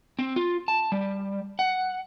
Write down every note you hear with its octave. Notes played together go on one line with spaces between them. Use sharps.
C4
F4
A5
G3
F#5